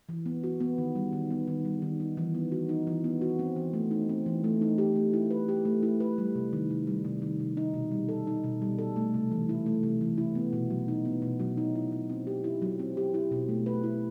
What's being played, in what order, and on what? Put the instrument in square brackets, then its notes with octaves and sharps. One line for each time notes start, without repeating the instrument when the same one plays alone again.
[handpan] E3
B3
F#4
B3
D#3
G3
D#3
B3
D#3
G3
D#3
D#4
E3
B3
F#4
D#4
E3
B3
F#4
C4
E3
A3
D#4
C4
E3
A3
D#4
G4
A3
E4
B4
G4
A3
E4
B4
G3
C3
D#3
C3
G3
C3
D#3
C3
D#4
B2
G3
A4
D#4
B2
G3
A4
A3
C3
E3
E4
A3
C3
E3
E4
B3
B2
F#3
D#4
B3
B2
F#3
D#4
E4
F#3
C4
G4
E4
F#3
C4
G4
E4
B2
A3
B4
E4